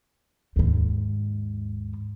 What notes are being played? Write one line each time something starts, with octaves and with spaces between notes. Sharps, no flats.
D#2 G#2